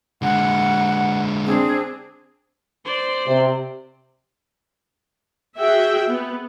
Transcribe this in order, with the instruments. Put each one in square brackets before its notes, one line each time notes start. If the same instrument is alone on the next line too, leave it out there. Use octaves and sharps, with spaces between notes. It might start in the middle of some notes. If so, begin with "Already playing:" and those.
[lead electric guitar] D3 G#3 [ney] F#5
[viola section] C4 D4 [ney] G#4
[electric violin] C5 D5
[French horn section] C3
[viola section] F#4 G#4 E5 G5
B3